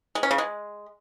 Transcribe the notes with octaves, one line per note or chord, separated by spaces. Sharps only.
G#3
C#4
C#3
G#3